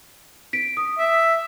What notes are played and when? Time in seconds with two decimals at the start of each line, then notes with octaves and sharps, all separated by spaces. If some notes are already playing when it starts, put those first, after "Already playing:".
0.53 B6 D7
0.77 D#6
0.99 E5